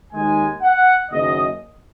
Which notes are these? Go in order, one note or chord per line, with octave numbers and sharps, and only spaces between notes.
D#2 D#3 G#3 G#5
F#5
F#1 F#2 D#3 A#3 D#5